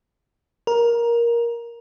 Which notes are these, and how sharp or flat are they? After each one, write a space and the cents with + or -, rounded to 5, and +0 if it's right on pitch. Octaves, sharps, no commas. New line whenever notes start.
A#4 +15